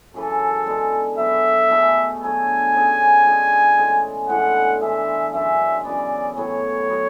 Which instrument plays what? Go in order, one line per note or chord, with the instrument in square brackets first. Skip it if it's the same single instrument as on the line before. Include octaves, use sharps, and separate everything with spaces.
[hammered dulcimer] F#2 C#3 E3 [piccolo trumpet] A4
[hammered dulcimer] D3 G#3 B3 D4
[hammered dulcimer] F#3 B3 F#4 [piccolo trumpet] E5
[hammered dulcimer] B2 A3 E4 G#4
[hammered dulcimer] D3 F#3 B3 [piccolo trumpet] G#5
[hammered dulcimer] F#3 C#4 G#4
E3 G#3 D4 F#4
A2 G#3 C#4
[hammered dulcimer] A2 E3 G#3 D4 [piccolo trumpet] F#5
[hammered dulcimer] E3 G#3 D4 [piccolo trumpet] E5
[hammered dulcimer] F#2 C#3 G#3 D4 [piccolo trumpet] E5
[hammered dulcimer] F#2 C#3 E3 B3 [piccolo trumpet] D5
[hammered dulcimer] A2 F#3 B3 [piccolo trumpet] C#5
[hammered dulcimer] F#3 B3 F#4